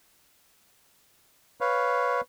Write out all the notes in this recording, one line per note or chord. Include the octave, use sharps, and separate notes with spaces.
B4 C#5 F5